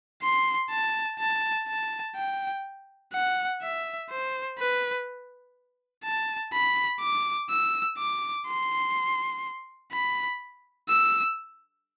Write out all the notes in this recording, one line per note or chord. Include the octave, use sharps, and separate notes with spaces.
C6
A5
A5
A5
G5
F#5
E5
C5
B4
A5
B5
D6
E6
D6
C6
B5
E6